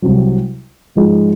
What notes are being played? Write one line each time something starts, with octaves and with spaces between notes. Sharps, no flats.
C2 C3 F#3
G#2 F3 G#3 D#4